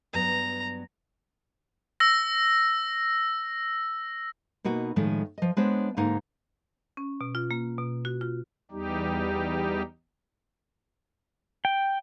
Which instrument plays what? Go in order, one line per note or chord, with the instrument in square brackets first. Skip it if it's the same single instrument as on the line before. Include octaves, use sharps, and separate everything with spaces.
[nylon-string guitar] G2 F#3 B3 [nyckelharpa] A#5
[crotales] E6 A#6
[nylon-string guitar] B2 A#3 D#4 F#4
A2 D#3 F3 G#3 A3
F3 D#5
G#3 B3 D4 C5 C#5
G#2 D3 A#3 D#4 F#5
[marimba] C#4
B2
F4
A#3
B2
F#4
F4
[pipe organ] E2 G3 D#4 G4
[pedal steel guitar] G5